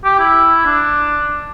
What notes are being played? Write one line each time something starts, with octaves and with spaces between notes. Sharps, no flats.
G4
E4
D4